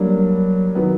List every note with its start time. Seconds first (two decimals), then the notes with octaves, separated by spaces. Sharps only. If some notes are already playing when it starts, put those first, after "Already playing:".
Already playing: F#3 G3 A#3 D4
0.75 D#3 F#3 B3